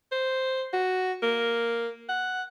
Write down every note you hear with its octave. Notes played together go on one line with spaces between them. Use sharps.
C5
F#4
A#3
F#5